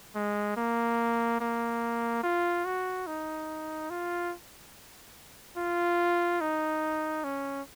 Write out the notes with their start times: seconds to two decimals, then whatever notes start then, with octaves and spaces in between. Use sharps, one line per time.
0.15 G#3
0.57 A#3
1.41 A#3
2.24 F4
2.65 F#4
3.07 D#4
3.90 F4
5.57 F4
6.41 D#4
7.24 C#4